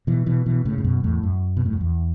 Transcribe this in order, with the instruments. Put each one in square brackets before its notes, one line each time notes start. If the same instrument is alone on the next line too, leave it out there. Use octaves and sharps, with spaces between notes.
[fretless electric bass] B2 E3
B2 E3
B2 E3
A2 C#3
A2
F#2 B2
E2 A2
F#2
B2
A2
F#2
E2